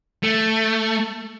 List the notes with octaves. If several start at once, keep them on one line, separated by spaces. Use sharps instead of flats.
A3